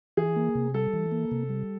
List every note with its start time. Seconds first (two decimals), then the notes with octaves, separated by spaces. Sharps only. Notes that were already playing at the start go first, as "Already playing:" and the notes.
0.17 E3 G#4
0.36 A#3
0.55 C3
0.74 G3 A4
0.93 E3
1.12 A#3
1.31 C3
1.49 G3